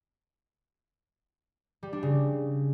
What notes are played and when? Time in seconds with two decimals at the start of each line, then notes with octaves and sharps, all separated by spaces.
1.83 G3
1.93 D4
2.03 C#3